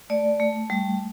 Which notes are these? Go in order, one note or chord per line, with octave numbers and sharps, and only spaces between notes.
A3 D5
A3
G3